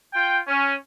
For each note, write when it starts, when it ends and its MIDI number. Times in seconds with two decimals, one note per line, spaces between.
0.13 0.39 65
0.13 0.39 79
0.48 0.74 61